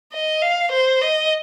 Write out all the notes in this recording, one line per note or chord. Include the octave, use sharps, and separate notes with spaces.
D#5
F5
C5
D#5